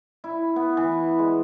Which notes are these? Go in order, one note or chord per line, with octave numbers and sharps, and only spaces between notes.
E4
B3
E3
G#3